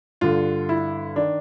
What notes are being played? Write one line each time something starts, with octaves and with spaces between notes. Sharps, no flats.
G2 D3 F4
E4
D#3 D4